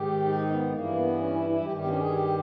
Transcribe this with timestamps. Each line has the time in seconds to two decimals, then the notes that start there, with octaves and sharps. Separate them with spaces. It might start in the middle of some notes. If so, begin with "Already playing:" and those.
Already playing: G#2 D#3 G4
0.25 D#4
0.49 B3
0.72 G2 E3 A#3
0.95 B3
1.19 C#4
1.33 E4
1.49 E4
1.65 G2 D#3 G4
1.77 G4
1.82 B3
1.88 C#4
1.99 G#4
2.11 G4